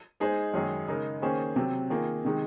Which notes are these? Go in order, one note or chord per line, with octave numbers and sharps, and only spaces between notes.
G#3 D#4 G#4 C5
F#2 D#3 G#3 D#4 G#4
C#3 G#3 D#4 A#4
D#3 A#3 C#4 G#4 C5
C3 F#3 C4
D#3 A#3 F4 G#4
C3 D#3 G#3 D#4